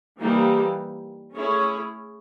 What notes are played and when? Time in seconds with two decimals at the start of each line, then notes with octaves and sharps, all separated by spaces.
0.19 E3 G3 A#3 D#4 G4
1.36 A3 C#4 E4 G#4 C#5